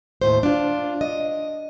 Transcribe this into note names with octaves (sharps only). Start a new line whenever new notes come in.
D#2 A2 C5
D4 F4
D#5